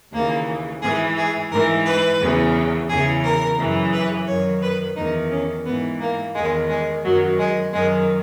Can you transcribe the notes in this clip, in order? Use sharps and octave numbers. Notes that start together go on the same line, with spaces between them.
D#2 C#3 E3 A#3
G#2 E3 G#4
G#4
G#2 E3 A#4
B4
E2 C#3 E3
E2 C#3 E3 G#4
A#4
F#2 C#3 E3
B4
F#2 D#3 C#5
B4
E2 D#3 D#4
C#4
G#2 E3 B3
A#3
E2 D#3 G#3
G#3
F#2 D#3 F#3
G#3
F#2 D#3 G#3